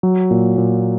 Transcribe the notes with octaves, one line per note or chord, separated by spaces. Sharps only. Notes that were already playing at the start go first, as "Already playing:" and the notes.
F#3
A#2
A#2